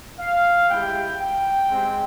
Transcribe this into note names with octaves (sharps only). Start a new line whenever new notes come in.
F5
G#3 E4 G4 G5
G5
G#3 C4 G4